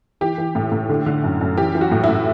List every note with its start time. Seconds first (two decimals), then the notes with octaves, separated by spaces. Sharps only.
0.21 E3 G4
0.38 E3
0.55 A2
0.72 A2
0.89 D3
1.06 D3
1.24 F#2
1.41 F#2
1.57 E3 G4
1.75 E3
1.81 F#4
1.92 A2
2.04 A2 E4